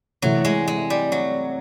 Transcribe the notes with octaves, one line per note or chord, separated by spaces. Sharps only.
C3 E3 F#3 A3 C4 E4
G#3
G#3
G3
F#3